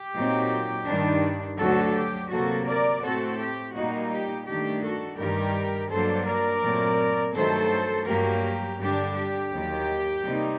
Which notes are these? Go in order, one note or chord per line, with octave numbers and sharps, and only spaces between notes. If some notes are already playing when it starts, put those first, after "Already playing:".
Already playing: G4
A#2 F#3 C4 D#4
G2 D#3 G3 D4
D2 D3 F#3 F#4 A4
G4
C3 F#3 A#3 F#4 A4
A#4 D5
A2 A3 C4 F#4 A4
G4
A#2 G3 A#3 D#4 F#4
G4
G2 D#3 A3 D4 G4
F#4 A4
G2 D#3 G3 G4 A#4
G2 F#3 A#3 D4 A4 C5
A#4 D5
A#2 F#3 A3 C4
G2 D#3 F#3 A3 A4 C5
G2 F#3 A#3 G4 A#4
G2 D3 G3 D4 G4
G4
D#2 D#3 F#3
C3 G3 A#3 D#4